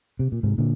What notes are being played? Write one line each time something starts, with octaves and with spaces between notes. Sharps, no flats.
C3
A#2
G#2 C3
A#2 D3